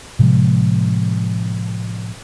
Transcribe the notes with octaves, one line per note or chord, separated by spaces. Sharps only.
A2 C3 F3 G#3